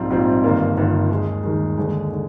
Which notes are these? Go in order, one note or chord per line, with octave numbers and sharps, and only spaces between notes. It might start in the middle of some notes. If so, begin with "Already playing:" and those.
Already playing: A#1 G#2 G3 C4 F4
A#1 G#2 G3 C4 F4
G1 G2 D#3 A#3 F4
G1 G2 D#3 A#3 F4
D#2 D#3 G#3
D#2 D#3 G#3
D#2 D3 G#3
D3